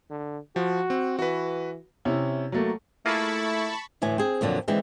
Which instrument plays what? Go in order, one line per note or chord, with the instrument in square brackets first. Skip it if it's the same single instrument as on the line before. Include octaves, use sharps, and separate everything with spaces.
[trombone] D3
[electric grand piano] F3 [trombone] F#4
[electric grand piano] C4
[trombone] E3 [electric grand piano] F#4 B4
[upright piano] C3 C#4 E4
F#3 A3 A#3
[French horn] A3 [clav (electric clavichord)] A#3 F4 G#4 [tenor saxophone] E4 [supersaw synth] A5 B5 C#6
[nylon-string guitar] D2 A2 E3 G#5
C4 G#4
F2 A#2 D3 F#3
D3 E3 G#3 C4